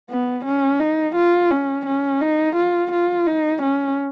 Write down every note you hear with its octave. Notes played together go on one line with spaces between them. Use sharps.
B3
C#4
D#4
F4
C#4
C#4
D#4
F4
F4
D#4
C#4